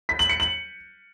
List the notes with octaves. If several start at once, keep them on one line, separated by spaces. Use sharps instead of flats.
B6
F#7
C#7
F#7